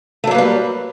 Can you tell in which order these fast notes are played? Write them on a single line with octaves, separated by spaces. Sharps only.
A3 F#3 A#3 B4 G3